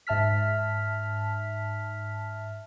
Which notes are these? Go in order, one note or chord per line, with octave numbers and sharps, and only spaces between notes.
G#2 E5 A5 F6 B6